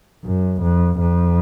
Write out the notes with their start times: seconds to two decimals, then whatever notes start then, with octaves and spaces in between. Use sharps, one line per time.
0.24 F#2
0.62 F2
1.00 F2